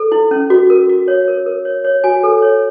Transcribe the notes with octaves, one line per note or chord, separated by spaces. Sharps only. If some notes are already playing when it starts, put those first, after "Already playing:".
Already playing: A4
E4
C#4
F#4
A#4
F#4
C#5
A#4
A#4
C#5
C#5
F#4 G#5
A4
C#5